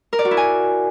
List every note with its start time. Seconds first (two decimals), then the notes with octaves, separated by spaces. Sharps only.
0.13 A#4
0.19 D5
0.25 F#4
0.31 E4
0.37 G#5